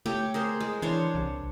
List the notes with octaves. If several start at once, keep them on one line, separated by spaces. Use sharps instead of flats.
A3 G4 C#5 G5
G#4 A#4 C5
G#3
E3 D4 C5 C#5
C2